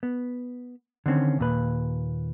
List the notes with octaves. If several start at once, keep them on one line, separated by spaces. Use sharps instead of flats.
B3
D3 D#3 C4 C#4
D#2 A#2 B4